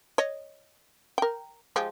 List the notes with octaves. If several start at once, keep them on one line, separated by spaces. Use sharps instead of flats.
C#5 D#5
A#4 G5
F3 G#3 G4